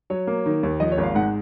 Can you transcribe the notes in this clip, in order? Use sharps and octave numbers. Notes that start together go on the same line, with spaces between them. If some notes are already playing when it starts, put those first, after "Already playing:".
F#3 C#5
A#3
D#3
D#2
F3 D#5
C#5
G#1
F5
G#2 F#5